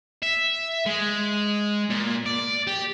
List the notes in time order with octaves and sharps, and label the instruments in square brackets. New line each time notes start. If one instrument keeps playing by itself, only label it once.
[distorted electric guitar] E5
G#3
A#2
D5
G4